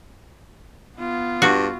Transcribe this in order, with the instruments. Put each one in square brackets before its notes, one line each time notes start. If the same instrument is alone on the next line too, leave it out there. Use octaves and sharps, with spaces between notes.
[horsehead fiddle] B3 F4
[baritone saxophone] G2 [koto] F#4